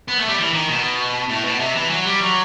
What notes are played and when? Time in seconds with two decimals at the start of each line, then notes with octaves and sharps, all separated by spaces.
0.08 B3
0.18 A3
0.28 G3
0.39 E3
0.53 D#3
0.69 B2
1.29 A2
1.45 B2
1.59 C3
1.75 E3
1.90 F#3
2.05 G3
2.21 F#3